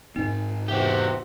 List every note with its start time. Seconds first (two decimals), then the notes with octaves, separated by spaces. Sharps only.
0.16 G#2 C4 D#4
0.68 E2 C3 F#4 G4